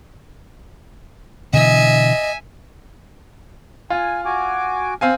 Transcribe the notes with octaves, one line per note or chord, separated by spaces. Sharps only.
B2 D3 E3 D#5 E5 G#5
F4 G#5
F#4 G#5 D6
C4 F5 G#5